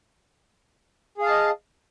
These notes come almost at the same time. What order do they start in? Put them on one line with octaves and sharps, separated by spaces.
G#4 F5 A5 D#5